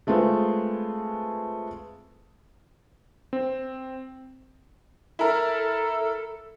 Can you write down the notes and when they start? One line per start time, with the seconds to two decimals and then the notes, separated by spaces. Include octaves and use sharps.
0.07 G#3 A3 C4 F4 G#4 B4
3.33 C4
5.19 E4 A4 A#4